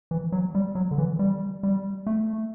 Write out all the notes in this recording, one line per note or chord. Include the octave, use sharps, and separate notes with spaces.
E3
F#3
G3
F#3
D3
E3
G3
G3
A3